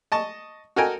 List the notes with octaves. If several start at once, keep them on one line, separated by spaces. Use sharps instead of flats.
D#5 A5 C#6
F#4 A4 A#4 D#5 G5 G#5